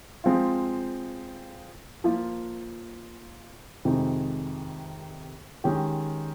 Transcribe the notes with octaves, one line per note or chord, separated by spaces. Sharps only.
F3 G#3 C4 F4
F3 A#3 F4
F2 C3 D#3 G#3 D#4
D#3 G#3 C#4 G4